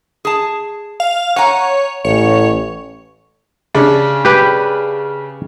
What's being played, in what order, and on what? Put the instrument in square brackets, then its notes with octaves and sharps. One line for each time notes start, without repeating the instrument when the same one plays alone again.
[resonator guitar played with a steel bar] G#4 A5
[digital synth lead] F5
[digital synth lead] C#5 [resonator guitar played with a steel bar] F#5 G#5 A#5
[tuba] A1 [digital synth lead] C#5
[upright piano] C#3 D4
[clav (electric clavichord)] G4 B4